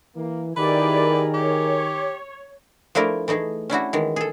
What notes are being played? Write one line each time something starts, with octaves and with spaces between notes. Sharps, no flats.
E3 A#3
D#3 E4 G4 G#4 A#4 B4 D5
G4 C#5
F3 A3 D4 E4 A#4
E3 A3 D#4 G#4
C#4 D4 E4 F#4
D#3 E3 G#3
G#4 A4